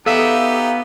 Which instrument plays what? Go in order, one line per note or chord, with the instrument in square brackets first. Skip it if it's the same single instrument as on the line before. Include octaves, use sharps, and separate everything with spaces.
[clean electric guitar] B3 E5 [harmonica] D#4 G4 [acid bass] A4 [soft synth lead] F5